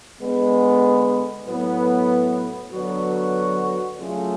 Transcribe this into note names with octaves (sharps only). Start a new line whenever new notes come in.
D3 G#3 B3
A2 F#3 B3
D3 F#3 B3 F#4
C#3 F#3 A3 F4 G#4